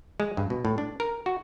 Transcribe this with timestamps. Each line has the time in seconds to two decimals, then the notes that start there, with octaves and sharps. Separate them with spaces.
0.20 G#3
0.37 G2
0.50 B2
0.65 A2
0.78 D4
1.00 A#4
1.26 F#4